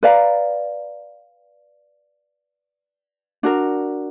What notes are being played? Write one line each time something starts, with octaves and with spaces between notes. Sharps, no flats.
B4 D5 F5 A#5
D4 F#4 A#4